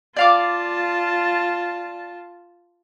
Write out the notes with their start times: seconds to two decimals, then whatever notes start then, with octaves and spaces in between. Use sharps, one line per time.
0.16 F4 D5 F5 A5 D6